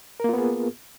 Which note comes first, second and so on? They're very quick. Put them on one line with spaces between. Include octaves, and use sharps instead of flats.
A#4 A#3 F4 B3 G#4